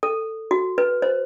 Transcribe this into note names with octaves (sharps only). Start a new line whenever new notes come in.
A4
F#4
B4
C5